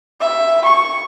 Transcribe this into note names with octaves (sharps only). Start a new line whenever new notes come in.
E5
C#6